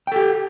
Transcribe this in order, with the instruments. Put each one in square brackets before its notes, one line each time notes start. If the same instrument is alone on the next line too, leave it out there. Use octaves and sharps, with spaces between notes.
[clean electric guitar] G5
A4
G4